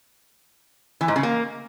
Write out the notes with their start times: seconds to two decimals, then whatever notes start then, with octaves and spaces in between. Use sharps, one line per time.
1.01 E3
1.08 G#2
1.16 C#3
1.23 A#3